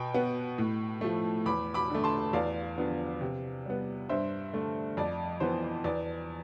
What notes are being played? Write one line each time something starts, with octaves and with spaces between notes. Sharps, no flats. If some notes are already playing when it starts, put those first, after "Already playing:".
Already playing: B2 G5 B5
B3
A2
F3 A3
E2 B5 D6
B5 D6
D3 A3
A5 C6
E2 D5 F5
D3 F3 B3
C3
G3 B3
G2 C5 E5
D3 A3
F2 D5
E3 B3 C5
E2 D5